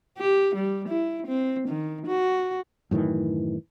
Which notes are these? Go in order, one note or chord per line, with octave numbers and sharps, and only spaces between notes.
G4
G3
E4
C4
D#3
F#4
F#2 A2 D#3 E3